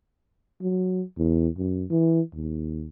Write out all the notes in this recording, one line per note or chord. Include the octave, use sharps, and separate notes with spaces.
F#3
E2
F#2
E3
D#2